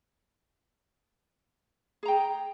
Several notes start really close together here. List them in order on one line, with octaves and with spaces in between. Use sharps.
G#4 A#5 G5